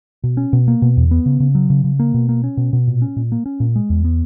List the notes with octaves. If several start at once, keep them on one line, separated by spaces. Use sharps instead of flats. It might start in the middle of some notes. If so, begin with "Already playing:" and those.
B2
C#4
B2
A#3
B2
E2
B3
C#3
C#3
F#3
C#3
C#3
A#3
B2
A#3
C#4
B2
B2
A#2
C#4
A#2
A#3
C#4
A#2
G#3
E2
B3